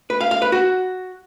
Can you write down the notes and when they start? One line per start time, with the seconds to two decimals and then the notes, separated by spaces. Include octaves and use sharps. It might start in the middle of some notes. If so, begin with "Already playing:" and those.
0.10 B4
0.21 F5
0.31 F5
0.42 B4
0.52 F#4